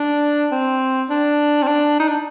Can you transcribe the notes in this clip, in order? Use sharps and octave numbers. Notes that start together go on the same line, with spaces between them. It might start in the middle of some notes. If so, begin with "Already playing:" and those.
Already playing: D4
C4
D4
C4
D4
D#4
D4